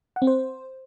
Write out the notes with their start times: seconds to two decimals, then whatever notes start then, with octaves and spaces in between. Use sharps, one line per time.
0.16 F#5
0.22 C4
0.27 C5